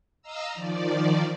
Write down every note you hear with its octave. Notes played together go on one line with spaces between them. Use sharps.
D#5 F5 A#5 E6
D#3 F3 D5